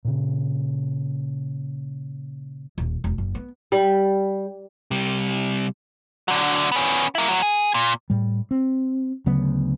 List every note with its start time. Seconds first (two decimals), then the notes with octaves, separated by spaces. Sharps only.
0.05 A#2 C#3
2.78 D#1
3.04 E1
3.18 F#1
3.35 B3
3.72 G3
4.91 C3 G3
6.28 D3 F#3
6.72 B3 C#4
7.15 A#3 E4
7.28 A2 F#3
7.42 G#4
7.74 A#2
8.10 A2 G3
8.51 C4
9.26 D2 C#3 F#3 B3